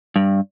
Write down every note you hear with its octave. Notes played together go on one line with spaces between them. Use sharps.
G2